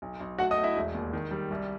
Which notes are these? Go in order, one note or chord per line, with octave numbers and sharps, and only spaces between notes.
B1
B1
A3 F#4 F#5
D#5 D#6
A3
E4 E5
E1
D#2
D#3
G3
C2